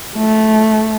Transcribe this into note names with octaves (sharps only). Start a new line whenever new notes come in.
A3